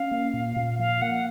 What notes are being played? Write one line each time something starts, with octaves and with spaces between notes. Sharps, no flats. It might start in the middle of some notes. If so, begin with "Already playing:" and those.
Already playing: C#4 F5
A#3
A#2
A#2
F3 F5
A#3 F#5